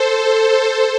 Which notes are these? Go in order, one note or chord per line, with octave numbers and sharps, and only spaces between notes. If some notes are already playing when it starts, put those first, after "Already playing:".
Already playing: A4 C5